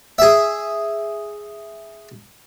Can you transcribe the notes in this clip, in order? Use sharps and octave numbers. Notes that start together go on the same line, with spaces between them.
G#4 E5